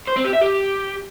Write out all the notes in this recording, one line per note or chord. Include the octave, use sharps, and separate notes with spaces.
C5
C4
G4
E5
G4